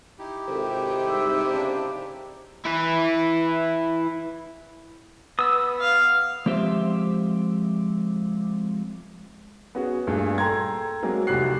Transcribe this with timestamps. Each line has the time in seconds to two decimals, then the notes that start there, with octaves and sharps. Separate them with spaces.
0.19 D#4 E4 G4
0.48 G#1 C3 A4 G5
1.06 G#2 G3 E5
1.48 F#1 C#3 D4
2.65 E4 B4
5.39 B3 D#6 E6
5.81 F5
6.46 F3 G#3 C4 G4 C5 E5
9.75 B3 C#4 F#4 G#4
10.07 G2 A#2 A3 G#4
10.38 A4 G5 A#5 C6 G#6
11.03 F#3 G#3 A#3 C4
11.27 F1 C2 F#4 G4 F#6 C7